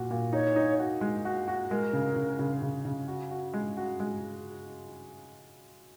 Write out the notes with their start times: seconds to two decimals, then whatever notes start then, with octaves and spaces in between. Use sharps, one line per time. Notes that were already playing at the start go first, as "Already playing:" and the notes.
Already playing: A#2 F#4
0.11 A#2
0.32 D#4 C#5
0.56 D#4
0.79 F#4
1.01 G#3
1.25 F#4
1.48 F#4
1.71 G#3 A#4
1.93 C#3
2.16 C#3
2.39 C#3
2.62 C#3
2.85 C#3
3.08 F#4
3.31 F#4
3.53 G#3
3.77 F#4
4.00 G#3